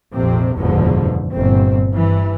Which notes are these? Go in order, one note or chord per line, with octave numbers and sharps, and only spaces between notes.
A#1 F2 C3 C4
F#1 E2 G#2 B2 D3 F3
G1 A#2 C4
G2 E3